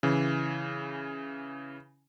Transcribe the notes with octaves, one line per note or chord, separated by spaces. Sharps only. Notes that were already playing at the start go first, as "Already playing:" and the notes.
C#3 E3